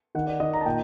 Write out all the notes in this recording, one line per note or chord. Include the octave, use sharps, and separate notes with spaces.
D#3 F#5
D5
D#3 D#5
A#5
A5
A#2 G5